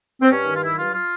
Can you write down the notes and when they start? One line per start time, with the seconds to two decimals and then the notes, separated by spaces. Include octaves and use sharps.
0.22 C4
0.30 G2 C#4
0.46 D#3
0.54 F4
0.62 F#3 E4
0.78 G2 F4
0.94 F4